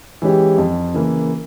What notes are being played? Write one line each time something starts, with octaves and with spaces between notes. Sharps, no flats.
E3 G#3 C#4 G4
F2
C#3 E3 A#3